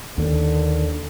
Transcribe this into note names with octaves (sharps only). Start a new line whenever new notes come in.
D#2 D3 D#3